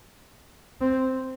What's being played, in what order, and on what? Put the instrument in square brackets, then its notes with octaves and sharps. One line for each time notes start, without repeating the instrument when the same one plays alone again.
[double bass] C4